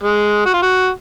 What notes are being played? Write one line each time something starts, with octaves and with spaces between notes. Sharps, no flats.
G#3
F#4
F4
F#4